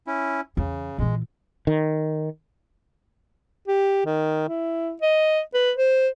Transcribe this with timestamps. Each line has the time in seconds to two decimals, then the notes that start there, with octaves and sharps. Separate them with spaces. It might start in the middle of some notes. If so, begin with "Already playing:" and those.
0.07 C#4 E4
0.57 E2 C#3
0.98 A#2 E3 G#3
1.67 D#3
3.67 G4
4.06 D#3
4.48 E4
5.02 D#5
5.54 B4
5.77 C5